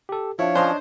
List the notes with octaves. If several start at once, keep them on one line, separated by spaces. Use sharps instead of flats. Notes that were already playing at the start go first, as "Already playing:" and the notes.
G4 A4
F3 D4 E4 C#5 F5
F3 C#4 D4 C5 C#5 D#5 C6